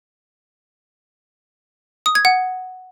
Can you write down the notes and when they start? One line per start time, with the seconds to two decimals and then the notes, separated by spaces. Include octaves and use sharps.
2.06 D#6
2.15 G#6
2.25 F#5